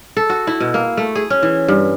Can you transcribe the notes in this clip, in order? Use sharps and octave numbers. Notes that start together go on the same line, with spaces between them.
A4
F#4
E4
B2
A#3
A3
G#4
C#4
E3
G2